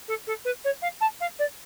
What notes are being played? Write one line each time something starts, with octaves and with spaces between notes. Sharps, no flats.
A4
A4
B4
C#5
F5
A5
F5
D5